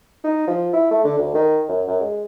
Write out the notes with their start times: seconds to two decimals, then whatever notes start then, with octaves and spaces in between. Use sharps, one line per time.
0.24 D#4
0.47 F3
0.73 E4
0.91 A3
1.04 D3
1.18 D2
1.34 D#3
1.69 F#2
1.87 F#2
2.01 G#3